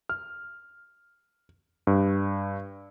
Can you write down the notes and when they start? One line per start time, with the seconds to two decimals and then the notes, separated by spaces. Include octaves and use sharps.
0.09 F6
1.87 G2